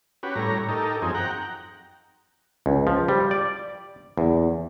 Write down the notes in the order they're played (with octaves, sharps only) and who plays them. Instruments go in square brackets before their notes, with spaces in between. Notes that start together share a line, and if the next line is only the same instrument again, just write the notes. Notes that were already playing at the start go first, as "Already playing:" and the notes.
[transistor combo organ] C#4 F#4 G4 B4
A2 G3 C#5 A#5
D#4 G4 A4 A#4
F#2 F3 C4 D#4 G#4
F#5 G5 A#5
[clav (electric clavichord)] C#2
F3
G3
D5
E2